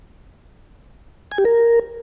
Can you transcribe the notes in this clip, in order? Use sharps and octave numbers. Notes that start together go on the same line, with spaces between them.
G#5
G4
A#4